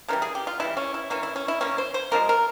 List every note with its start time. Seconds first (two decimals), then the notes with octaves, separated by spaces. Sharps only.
0.08 C#3 E3 G3 A#4
0.22 G#4
0.35 G4
0.47 F4
0.60 C#3 E3 G3 E4
0.77 C#4
0.94 E4
1.10 E3 A#3 C#4
1.23 E4
1.36 C#4
1.48 E4
1.61 E3 A#3 C#4
1.78 C5
1.94 C5
2.11 C3 F3 G#3 A#4
2.29 A#4